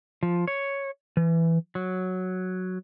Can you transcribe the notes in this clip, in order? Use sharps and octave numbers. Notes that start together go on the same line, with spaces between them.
F3
C#5
E3
F#3